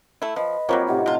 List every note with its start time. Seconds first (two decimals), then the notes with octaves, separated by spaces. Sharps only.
0.22 A3 E4
0.36 F3 B4 D#5
0.69 F#3 G3 A#3 C4 F4 C#5
0.87 A2 C3 D#4 F#5
1.06 C3 F3 F4